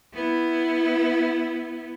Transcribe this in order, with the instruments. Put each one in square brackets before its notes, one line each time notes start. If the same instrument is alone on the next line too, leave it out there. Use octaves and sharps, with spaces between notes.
[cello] B3 E4